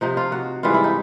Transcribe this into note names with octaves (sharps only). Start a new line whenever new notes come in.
C3 F3 D#4
F4
F#4
G#2 E3 G3 F4
E4
D#4